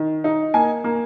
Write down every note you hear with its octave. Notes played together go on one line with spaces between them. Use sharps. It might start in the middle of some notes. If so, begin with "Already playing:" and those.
Already playing: D#3
D#4
A#3 G#5
A#3